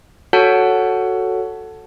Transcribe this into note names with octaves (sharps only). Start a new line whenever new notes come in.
F#4 A4 C#5 F#5 A5